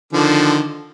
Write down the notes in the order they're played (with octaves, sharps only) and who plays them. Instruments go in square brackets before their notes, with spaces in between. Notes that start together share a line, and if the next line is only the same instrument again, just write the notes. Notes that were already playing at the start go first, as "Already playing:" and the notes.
[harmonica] D3 D#3 F3